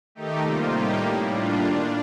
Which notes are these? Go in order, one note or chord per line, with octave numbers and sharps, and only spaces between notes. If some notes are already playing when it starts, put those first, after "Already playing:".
D#3 A3 D#4 G4
C3 G3 A#3 F4
A2 G3 A#3 D#4 G4
A2 G3 A#3
A2 G3 D4 F4
D#3 A#3 D4 F4